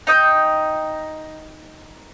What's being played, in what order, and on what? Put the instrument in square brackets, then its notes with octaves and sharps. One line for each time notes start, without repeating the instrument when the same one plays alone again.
[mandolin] D#4 D#5 G5